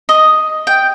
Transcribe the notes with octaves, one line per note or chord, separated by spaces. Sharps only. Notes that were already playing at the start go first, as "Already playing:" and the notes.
D#5
G5